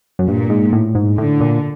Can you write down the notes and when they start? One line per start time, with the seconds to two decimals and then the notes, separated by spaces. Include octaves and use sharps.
0.19 F#2
0.27 G2 A#2
0.50 G#2
0.73 A2
0.95 G#2
1.18 A2 D3
1.41 A#2